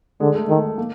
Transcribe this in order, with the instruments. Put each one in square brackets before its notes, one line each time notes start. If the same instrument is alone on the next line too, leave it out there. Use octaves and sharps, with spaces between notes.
[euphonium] D3 [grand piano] G#3
[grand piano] A3
[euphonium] D#3 [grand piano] A3
[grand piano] A#3